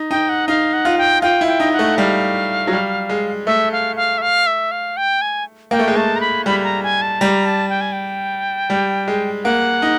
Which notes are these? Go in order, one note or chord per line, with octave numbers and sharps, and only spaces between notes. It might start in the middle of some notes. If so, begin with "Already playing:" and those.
Already playing: D#4
D#4 G5
F#5
D#4 F5
F#5
F4
G5
F4 G5
E4
G5
D#4
F#5
A3
G3 F5
F#3
G3
G#3
A3 E5
F5
F5
E5
F5
E5
F5
G5
G#5
A#3 G5
A3
G#3
A3 A5
A#5
B5
G3 B5
B5
A#5
G#5
A5
G3 A#5
A5
G5
G#5
G5
G3
G#3
A#3 F#5
D#4